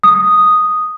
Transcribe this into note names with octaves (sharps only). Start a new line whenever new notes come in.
D#6